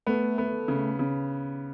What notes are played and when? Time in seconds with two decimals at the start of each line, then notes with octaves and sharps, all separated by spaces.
0.07 A3 B3
0.38 B3
0.68 C#3
0.99 C#3